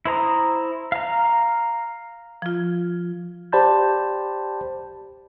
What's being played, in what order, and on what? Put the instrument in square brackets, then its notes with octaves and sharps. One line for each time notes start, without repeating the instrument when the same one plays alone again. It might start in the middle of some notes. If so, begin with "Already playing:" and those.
[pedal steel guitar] E4 C5 A#5 D#6
F5 A#5
[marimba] F3 F4
[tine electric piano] G4 C5 D5 A5 B5 G6